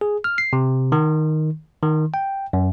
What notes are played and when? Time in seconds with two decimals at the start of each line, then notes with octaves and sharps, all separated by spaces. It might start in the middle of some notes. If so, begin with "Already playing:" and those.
0.01 G#4
0.24 F6
0.38 C7
0.53 C3
0.92 D#3
1.83 D#3
2.14 G5
2.53 F#2